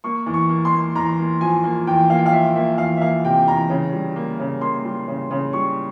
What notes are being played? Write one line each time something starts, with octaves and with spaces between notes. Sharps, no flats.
A#3 C#6
E2
C#6
A#3
C6
A#3
E2 A#5
A#3
F3 G#5
A#3
E2 G5
A#3 F5
G5
F5
F3 E5
A#3 E5
E2 F5
E5
A#3 F5
C3 G5
E2 A#5
C#3
G3
A#3
C#3
A#3 C6
G3
C#3
C#3
G3 C#6